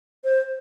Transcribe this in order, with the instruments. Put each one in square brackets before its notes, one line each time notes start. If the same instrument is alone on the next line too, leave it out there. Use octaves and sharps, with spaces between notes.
[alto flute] C5